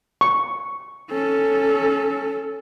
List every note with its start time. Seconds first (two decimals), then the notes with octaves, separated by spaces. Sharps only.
0.21 C#6
1.12 C#4 A4